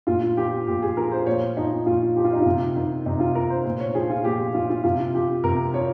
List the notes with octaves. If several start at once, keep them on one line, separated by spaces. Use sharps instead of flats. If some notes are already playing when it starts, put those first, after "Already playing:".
A#2 F4
F3 G4
A#2 G4
G#4
F3 A#4
C5
A#2 C#5
F3 D#4
A#2 F4
F3 G4
F4
D#4
C3 F4
D#3
C3 D#4
F4
D#3 A#4
C5
A#2 C5
C#5
F3 G#4
F4
A#2 G4
F3 F4
F4
C3 F4
F3 G4
C3 A#4
F3 C#5